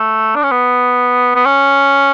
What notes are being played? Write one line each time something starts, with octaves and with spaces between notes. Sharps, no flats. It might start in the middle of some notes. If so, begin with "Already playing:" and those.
Already playing: A3
D4
C#4
B3
B3
C#4